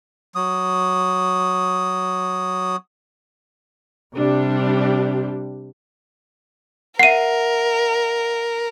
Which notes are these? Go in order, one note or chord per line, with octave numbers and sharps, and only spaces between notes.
F#3 D#6
C3 G3 D4 G4
A#4 E5 F#5 C7 D#7